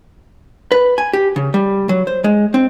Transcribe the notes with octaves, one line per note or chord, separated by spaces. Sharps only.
B4
G#5
G4
C#3
G3
F#3
C5
G#3
C4